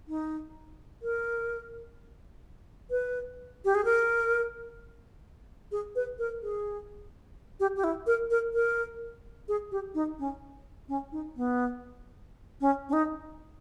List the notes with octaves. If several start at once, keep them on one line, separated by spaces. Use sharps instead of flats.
D#4
A#4
B4
G4
G#4
A#4
G#4
B4
A#4
G#4
G4
G4
E4
A#4
A#4
A#4
G#4
G4
D#4
C#4
C#4
D#4
B3
C#4
C#4
D#4